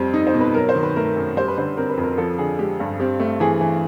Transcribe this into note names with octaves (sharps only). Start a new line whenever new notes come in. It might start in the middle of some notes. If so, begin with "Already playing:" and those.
Already playing: F2 G3 C4
D#4
C5
B2
B4
F#3 A#4
C5
D#3
B4
A3 A#4
F#2
G3 C5
B4
D3 C5
C4 A#4
B4
F2
A#4
F3 A4
D3 G#4
G#3 G4
G2
C4 G4
A3
E3 G#4
E3